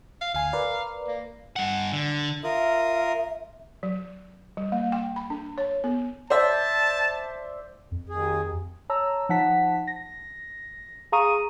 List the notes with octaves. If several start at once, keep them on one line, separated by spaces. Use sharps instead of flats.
F5
D2 F5 G#5
A#4 B4 D5
A#3
G2 F#5
D3
F4 A#4 E5 D#6
F#3
G3
A#3
G5
B5
D4
C#5
B3
C5 D5 E5 A5
F2
D#2 G#4
C#5 A5 A#5 E6
F3 D#4 F#5 A5 B6
A#6
G#4 F5 A#5 C#6 D#6 D#7